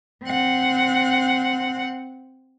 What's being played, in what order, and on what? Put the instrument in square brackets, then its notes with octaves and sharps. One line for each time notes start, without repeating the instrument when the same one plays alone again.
[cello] C4 F#5